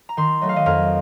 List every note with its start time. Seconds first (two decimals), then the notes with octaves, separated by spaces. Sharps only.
0.09 A#5
0.17 D#3 C6
0.42 F#3 A3 D#5
0.49 F5
0.56 D#5
0.66 F2 A#4